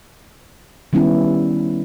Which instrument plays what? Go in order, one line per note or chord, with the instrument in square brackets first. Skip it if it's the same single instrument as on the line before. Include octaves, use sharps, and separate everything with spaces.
[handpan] D#3 G3 B3 C#4 E4